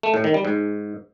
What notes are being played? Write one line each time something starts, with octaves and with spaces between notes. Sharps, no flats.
A3
A2
D#3
G3
G#2